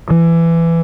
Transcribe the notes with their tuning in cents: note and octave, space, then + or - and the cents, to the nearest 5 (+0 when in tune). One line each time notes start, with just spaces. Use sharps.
E3 +20